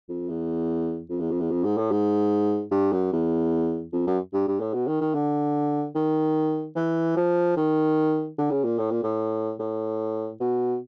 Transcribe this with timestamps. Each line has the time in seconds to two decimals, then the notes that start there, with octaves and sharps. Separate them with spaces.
0.09 F2
0.29 E2
1.10 F2
1.20 E2
1.31 F2
1.40 E2
1.51 F2
1.64 G#2
1.78 A2
1.91 G#2
2.72 G2
2.93 F#2
3.13 E2
3.93 F2
4.07 F#2
4.34 G2
4.48 G2
4.60 A2
4.74 B2
4.88 D#3
5.01 D#3
5.14 D3
5.95 D#3
6.76 E3
7.17 F3
7.57 D#3
8.38 D3
8.51 C#3
8.65 A#2
8.79 A2
8.91 A#2
9.03 A2
9.60 A2
10.40 B2